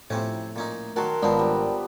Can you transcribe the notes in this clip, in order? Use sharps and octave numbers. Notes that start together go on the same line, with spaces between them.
A2 C3 F3 C4 C#4 E4
A#2 C#4 D#4
D#3 F#3 F#4 A#4 A5 C6
G#1 C#2 F3 B3 C4 D4
G3